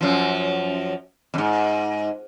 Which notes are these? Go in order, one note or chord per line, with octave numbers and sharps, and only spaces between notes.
F#2 F3
F2 G#2